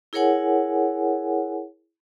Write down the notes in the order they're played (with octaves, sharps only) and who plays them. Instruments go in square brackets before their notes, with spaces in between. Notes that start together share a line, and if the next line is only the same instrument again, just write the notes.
[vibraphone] E4 G#4 A#4 C#5 F#5 G#5